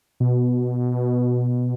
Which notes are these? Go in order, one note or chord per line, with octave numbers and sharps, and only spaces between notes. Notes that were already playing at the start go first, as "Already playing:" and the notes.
B2